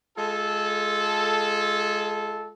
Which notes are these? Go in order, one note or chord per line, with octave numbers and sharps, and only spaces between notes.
G#3 F4 A4